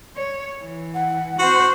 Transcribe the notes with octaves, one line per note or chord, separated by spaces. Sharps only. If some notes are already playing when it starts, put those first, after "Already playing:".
C#5
E3
F#5
C4 F#4 C5